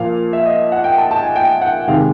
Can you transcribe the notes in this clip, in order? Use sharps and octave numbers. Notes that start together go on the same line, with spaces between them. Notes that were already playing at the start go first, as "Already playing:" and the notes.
Already playing: A#2 F3 A#3 F5
E5
D#5
F#5
G5
A5
A5
G#5
G5
F#5
C3 D#3 G#3 F5